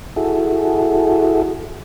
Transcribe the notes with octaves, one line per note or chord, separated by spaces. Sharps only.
E4 F#4 G#4 A4